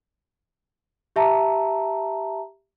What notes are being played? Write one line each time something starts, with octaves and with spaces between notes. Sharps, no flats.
G4 E5 A5 A#5